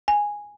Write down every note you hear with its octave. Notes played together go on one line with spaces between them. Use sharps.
G#5